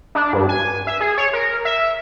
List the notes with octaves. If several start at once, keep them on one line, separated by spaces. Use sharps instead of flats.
D4
G2
G#5
E5
G#4
C#5
A#4
E5